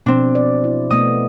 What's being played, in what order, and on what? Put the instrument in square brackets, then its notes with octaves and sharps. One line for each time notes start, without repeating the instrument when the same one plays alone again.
[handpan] B2 F3 [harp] C4 D4
[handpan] D5
E4
[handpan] B2 A3 B3 [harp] D#5 D#6